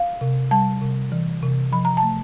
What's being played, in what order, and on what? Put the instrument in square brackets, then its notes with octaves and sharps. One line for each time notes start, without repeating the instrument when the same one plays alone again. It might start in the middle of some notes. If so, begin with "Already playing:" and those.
Already playing: [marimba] F5
C3
G3 A5
C3
E3
C3
F3 B5
A#5
A5
A3